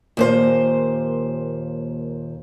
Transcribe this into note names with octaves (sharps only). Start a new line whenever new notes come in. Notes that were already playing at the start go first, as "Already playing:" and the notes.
D#2 A#2 C5